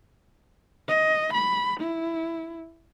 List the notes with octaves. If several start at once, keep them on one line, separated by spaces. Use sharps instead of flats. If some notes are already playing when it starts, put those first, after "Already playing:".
D#5
B5
E4